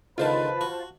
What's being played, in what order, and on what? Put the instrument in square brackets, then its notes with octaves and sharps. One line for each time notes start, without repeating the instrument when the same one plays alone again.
[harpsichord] C#2 D3 D#3 [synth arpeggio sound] F4 C5 A5 [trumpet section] B4
[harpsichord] F#4